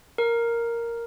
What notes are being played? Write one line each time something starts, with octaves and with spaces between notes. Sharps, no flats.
A#4